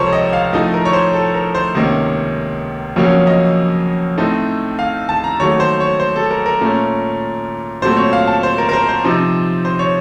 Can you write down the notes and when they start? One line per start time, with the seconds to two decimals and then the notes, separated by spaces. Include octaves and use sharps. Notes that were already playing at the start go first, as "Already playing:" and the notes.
Already playing: C#2 C3 F3 A4 A#4 C5 C#5
0.13 D#5
0.33 F5
0.53 A2 F3 A3 D#4 D#5
0.74 A#4
0.85 C#5
0.93 C5
1.13 A4
1.34 A#4
1.55 C5
1.75 C#2 C3 D#3 A#3 C#4 D#5
2.96 F2 C#3 F#3 A#3 C#4 C#5
3.27 D#5
4.18 A2 A3 C4 D#4
4.79 F5
5.09 A5
5.24 A#5
5.39 D#2 D#3 F#3 A3 C#5
5.60 C5
5.80 C#5
6.00 C5
6.16 A4
6.31 A#4
6.46 A#4
6.61 A#2 A3 C#4
7.82 A#2 F#3 A3 C4 C5
7.97 C#5
8.13 F5
8.27 A5
8.43 C5
8.58 A#4
8.69 A#4
8.73 C5
8.89 C5
9.04 C3 F3 C4 D#4
9.65 C5
9.79 C#5